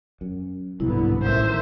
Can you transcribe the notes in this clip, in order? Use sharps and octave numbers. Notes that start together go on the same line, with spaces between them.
F#2
D1 C2 G#2 B2 D3 B3 E4
A1 D#3 A3 C5 E5